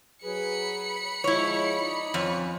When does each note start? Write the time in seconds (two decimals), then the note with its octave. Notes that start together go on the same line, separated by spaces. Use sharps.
0.24 F#3 G#4 B4 B5 C#7
1.24 F3 G#3 E4 C#5
1.81 D#4 D5 D#5
2.14 F2 C#4 C#5